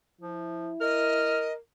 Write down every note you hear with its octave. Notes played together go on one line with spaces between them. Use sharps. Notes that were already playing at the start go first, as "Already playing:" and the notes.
F3 E4
A#4 D#5 F6